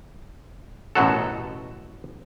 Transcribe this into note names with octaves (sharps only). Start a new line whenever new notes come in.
A1 F#2 B2 F#3 F#4 A4